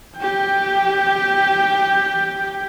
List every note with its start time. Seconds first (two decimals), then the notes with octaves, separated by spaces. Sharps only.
0.17 G4 G5